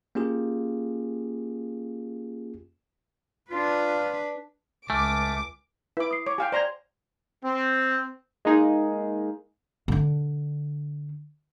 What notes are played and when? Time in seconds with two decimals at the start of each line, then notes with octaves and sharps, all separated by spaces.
0.15 A#3 C#4 F4 G4 G#4
3.51 D4 F4 B4
4.90 C#2 A3 G#5 D6 F6
5.97 E4 B4 D6
6.11 D#6 C7
6.27 C#5 D6
6.38 G4 F5 G5 G#5
6.52 C5 D5 A#5 C6 G#6
7.44 C4
8.45 G#3 A#3 D#4 G#4
9.88 D3 D4